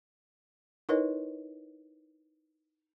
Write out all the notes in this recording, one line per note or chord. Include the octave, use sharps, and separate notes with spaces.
D#4 E4 A#4 B4 C#5 D#5